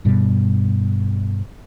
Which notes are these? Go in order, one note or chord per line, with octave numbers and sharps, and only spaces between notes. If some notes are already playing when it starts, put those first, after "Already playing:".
G2 B2 G3